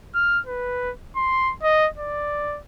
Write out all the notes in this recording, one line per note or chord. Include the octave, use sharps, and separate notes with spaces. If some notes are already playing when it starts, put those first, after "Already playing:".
F6
B4
C6
D#5
D5